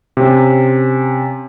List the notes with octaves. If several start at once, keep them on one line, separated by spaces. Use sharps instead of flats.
C3 C#4